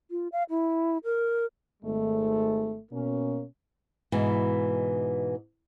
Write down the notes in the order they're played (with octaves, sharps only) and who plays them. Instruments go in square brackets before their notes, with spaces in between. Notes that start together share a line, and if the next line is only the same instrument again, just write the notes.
[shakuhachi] F4
F5
E4
A#4
[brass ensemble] G#1 G#3 A3
B2 A#3 C#4
[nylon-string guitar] G#2 B2 E3